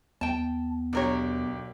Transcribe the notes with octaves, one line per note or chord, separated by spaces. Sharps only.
D#2 B3 G5 A5
B1 D4 G4 A#4 C#5